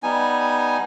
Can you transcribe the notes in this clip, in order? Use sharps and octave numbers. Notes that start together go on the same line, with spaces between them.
G3 B3 D#4 G#5